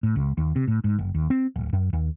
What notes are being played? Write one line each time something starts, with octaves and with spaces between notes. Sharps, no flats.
A2
C#2
D#2
C3
A2
G#2
F#1
D#2
C4
D1
F#2
D#2